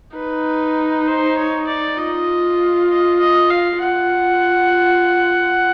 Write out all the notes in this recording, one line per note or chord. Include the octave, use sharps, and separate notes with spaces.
D#4 B4
C5
C#5
D5
F4 D#5
D#5
D#5
F5
F4 F#5